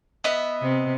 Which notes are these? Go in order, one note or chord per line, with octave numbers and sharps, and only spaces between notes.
B3 D#5 E5
C3